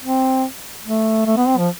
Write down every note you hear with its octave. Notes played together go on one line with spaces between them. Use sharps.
C4
A3
A3
B3
C4
F3